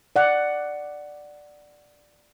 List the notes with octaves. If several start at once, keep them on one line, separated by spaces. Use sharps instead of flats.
D5 F#5